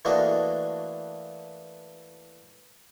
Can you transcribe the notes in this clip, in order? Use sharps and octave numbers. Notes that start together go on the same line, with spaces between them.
E3 A3 A#3 D4 F#4 D#5